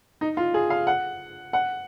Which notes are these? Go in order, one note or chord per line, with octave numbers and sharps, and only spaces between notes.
D#4
F4
G#4
F5
F#5
F#5